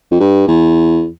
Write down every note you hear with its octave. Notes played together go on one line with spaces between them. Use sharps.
F2
G2
E2